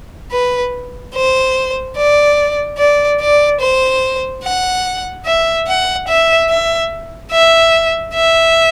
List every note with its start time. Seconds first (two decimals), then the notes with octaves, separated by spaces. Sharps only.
0.32 B4
1.15 C5
1.97 D5
2.78 D5
3.20 D5
3.60 C5
4.43 F#5
5.26 E5
5.67 F#5
6.08 E5
6.49 E5
7.31 E5
8.14 E5